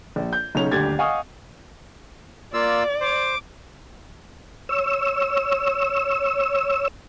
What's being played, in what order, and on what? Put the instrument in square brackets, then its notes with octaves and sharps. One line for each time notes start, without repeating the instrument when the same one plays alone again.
[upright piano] A#1
G6
B1 C#3 D#4 C#5 F7
D#1 D2 G4 G#6 A6
D#5 F5 F#5 G#5 C#6 D#6
[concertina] A#3 F4 E6 [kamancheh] D5
[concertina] C5 [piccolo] D6
[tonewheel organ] C#5 E6